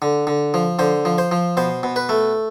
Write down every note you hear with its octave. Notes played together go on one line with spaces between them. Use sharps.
D3
D3
F3
D3 C5
F3
C5
F3
B2 C5
B2
B4
A3